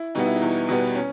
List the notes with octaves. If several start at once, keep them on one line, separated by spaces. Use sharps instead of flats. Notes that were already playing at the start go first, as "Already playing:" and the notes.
Already playing: E4
B2 G3 B3 D#4
E4
D#4
E2
B2 G3 B3
C#4